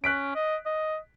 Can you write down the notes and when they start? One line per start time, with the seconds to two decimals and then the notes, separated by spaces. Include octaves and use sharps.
0.04 C#4 F#6 B6 D7
0.35 D#5
0.66 D#5